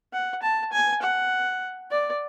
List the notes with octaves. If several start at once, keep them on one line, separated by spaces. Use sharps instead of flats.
F#5
A5
G#5
F#5
D5